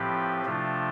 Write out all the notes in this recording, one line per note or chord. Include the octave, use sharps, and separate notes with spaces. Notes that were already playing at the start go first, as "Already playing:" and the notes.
Already playing: A2 F3 C4 G4 B4
C3 F3 A3 D4 F4